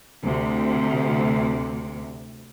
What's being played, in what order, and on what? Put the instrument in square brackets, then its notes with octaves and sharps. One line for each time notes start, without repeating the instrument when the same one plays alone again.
[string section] D2 C3